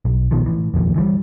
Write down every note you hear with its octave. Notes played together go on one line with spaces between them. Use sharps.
B1
A#1 B2 D#3 F3
A2 E3
F1 A#1 D#2 A#2
E3 F3 G3